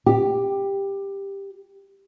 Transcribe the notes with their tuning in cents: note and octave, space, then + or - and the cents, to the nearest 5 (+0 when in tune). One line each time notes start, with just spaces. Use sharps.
G4 +10